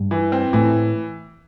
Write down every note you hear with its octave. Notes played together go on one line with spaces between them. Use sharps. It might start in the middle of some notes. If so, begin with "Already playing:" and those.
Already playing: G2
E3
C4
A2 E3